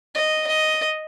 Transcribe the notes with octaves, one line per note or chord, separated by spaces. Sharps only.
D#5
D#5